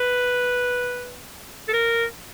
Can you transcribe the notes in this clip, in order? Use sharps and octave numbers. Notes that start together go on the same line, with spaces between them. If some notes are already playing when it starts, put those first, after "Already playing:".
Already playing: B4
A4
A#4